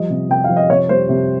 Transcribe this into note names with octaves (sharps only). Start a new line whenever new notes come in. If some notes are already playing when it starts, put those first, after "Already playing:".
Already playing: F3 G3 D#5
C3
C3 G5
F3 F5
D#5
C3 C#5
G3 C5
C3